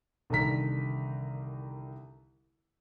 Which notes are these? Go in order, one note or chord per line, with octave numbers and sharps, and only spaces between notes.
C2 D3 D#3 A#5 B6